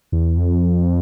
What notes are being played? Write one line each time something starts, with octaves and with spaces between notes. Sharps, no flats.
E2
F2